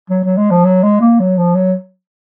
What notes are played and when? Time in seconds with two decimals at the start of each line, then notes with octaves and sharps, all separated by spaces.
0.10 F#3
0.24 F#3
0.37 G#3
0.51 F3
0.65 F#3
0.83 G#3
1.01 A#3
1.19 F#3
1.37 F3
1.55 F#3